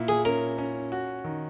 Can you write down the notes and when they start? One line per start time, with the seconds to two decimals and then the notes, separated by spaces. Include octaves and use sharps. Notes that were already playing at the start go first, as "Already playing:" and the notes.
Already playing: A#2 E4
0.08 G#4
0.25 C#4 A#4
0.58 C#4
0.92 F#4
1.24 D#3